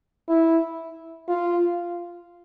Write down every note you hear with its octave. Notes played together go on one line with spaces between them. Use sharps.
E4
F4